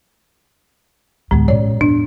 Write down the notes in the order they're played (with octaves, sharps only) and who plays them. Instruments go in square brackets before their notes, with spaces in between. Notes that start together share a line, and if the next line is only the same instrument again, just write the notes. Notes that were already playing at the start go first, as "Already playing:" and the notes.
[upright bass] D2 B3 [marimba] A2 G#3
[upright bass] A1 A2 [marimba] C#5 D5
[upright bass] E2 A2 [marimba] D4